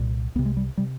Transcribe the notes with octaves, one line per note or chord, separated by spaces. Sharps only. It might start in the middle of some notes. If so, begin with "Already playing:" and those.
Already playing: C2 A#2
C2 C3 B3
G#3
G3
C3 G3